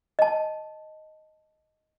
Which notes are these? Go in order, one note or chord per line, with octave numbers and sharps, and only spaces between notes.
D#5 A5